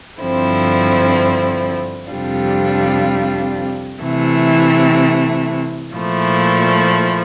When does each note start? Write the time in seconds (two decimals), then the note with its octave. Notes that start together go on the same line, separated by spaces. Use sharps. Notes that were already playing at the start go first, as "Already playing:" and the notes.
0.19 G2 D3 F3 C4 E4
2.11 F2 C3 G3 D4 F4
4.03 C3 E3 A3
5.94 A#2 F3 A3 E4